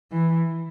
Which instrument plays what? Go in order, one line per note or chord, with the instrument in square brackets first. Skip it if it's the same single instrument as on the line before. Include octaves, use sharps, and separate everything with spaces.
[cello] E3